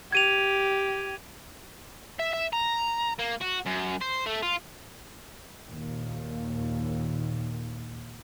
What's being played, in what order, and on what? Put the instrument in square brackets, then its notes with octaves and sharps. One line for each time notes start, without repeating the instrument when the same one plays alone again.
[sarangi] G4 [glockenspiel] G#6 D#7 F7
[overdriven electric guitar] E5
E5
A#5
A#3
F#4
F#2
C5
A3
F4
[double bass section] D#2 A#2